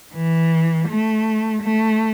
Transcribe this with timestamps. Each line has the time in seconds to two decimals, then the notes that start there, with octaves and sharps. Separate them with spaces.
0.15 E3
0.88 A3
1.63 A3